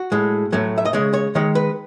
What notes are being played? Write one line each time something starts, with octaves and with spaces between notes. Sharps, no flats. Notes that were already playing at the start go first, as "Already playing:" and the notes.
Already playing: F#4
A2 G#3
A2 F#3 A3
E5
D#5
C#3 G#3 C#5
C#5
D#3 G#3 C#5
B4